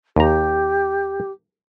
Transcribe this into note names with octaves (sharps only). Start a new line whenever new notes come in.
D#2 G4 A#5